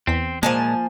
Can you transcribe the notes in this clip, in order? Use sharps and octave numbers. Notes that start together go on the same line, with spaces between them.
E2 C4 B6
A#2 F3 G#3 A#3 G#5 A5